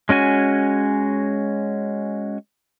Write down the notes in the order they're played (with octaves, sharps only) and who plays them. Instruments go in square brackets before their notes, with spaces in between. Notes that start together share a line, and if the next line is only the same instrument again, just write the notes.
[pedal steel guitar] G#3 C#4 F#4 G#5